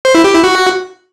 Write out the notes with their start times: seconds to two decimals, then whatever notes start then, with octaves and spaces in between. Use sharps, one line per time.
0.05 C5
0.15 E4
0.24 G4
0.34 E4
0.44 F#4